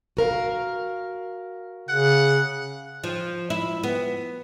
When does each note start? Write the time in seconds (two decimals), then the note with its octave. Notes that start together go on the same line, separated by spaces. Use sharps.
0.17 F#4 A#4 F5
1.89 C#3 F#5
3.04 F3
3.50 E4
3.83 B3